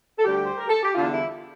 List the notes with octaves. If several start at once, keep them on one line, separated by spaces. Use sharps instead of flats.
A4
D2 D3 G3 G4
C5
A#4
A4
G4
E2 D3 G3 F4
E4